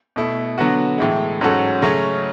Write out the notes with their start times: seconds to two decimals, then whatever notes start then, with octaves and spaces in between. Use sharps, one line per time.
0.16 B2 A3 E4
0.58 D3 F#3 B3 F#4
0.98 A2 E3 G#3
1.41 G#2 F#3 C#4 F#4 A4
1.82 C#3 F#3 A3 C#4